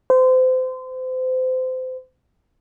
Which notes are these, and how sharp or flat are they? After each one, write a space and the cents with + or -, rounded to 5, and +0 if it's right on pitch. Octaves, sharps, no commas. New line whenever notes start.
C5 -30